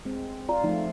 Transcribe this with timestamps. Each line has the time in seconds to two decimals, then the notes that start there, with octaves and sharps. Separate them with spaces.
0.05 G#3 C4
0.49 F4 D5 A#5
0.64 F3 A3 D#4 F5